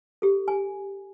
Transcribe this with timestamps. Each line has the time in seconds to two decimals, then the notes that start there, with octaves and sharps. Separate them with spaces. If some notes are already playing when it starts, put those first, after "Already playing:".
0.22 G4 A4
0.48 G#5